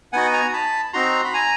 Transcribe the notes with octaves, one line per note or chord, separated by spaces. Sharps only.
B3 D#4 F#4 F#5 G#5
G#5 A#5
A5 B5
C4 D#4 F#4 A#5 C6
B5
G#5 A#5